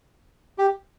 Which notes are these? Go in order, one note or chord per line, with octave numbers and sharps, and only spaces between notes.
G4